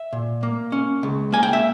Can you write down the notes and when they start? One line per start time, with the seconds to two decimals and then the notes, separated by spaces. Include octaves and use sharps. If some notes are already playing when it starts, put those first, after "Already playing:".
Already playing: E5
0.13 A#2
0.43 A#3
0.72 C#4
1.03 C#2
1.32 A#3 G#5
1.43 G5
1.53 E5